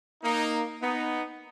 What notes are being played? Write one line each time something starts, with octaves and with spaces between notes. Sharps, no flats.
A#3 D#4
B3 D#4